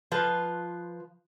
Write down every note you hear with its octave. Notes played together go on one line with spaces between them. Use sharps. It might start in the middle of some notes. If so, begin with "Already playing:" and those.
F3 F4 B4